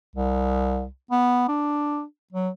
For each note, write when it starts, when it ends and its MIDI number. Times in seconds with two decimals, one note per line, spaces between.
0.16 0.86 36
1.11 1.47 59
1.49 2.03 62
2.33 2.49 54